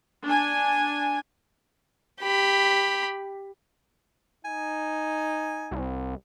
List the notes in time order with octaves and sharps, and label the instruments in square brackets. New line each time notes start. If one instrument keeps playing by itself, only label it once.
[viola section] D4 G#5
[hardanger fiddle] G4 B5
[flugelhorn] D#4 [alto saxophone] G#5
[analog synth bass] C2